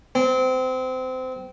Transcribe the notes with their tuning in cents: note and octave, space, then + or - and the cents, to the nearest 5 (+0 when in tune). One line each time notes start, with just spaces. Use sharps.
C4 -25